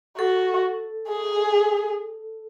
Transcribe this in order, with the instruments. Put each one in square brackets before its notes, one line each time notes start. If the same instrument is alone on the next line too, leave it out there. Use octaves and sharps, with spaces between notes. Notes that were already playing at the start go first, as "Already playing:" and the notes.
[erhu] F#4 [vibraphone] A4
[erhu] G#4